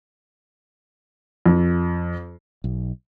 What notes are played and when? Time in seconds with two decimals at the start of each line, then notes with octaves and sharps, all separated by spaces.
1.46 F2
2.64 B1